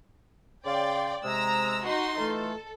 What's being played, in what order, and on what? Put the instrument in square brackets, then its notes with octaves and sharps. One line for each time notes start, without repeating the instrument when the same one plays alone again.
[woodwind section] C#3 F5 C6 [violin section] D5 G5
[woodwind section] C3 G#3 [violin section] A#5 E6
[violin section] D#4 F#4 C6
[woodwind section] E3 A3 F4 [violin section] A4